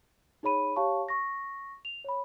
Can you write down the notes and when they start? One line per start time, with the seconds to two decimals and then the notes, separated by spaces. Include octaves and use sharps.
0.43 D#4 G#4 C#5 B5 D#7
0.76 G4 C#5 F5 A5 C#6
1.09 C#6 A#6
1.85 F7
2.04 C#5 B5